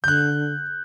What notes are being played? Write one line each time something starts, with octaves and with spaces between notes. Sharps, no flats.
D3 F#6 G6